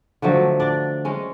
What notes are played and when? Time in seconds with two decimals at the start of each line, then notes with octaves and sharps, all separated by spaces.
0.22 D3 F3 F#3 A3
0.60 D4 D5
1.05 G#3 C#4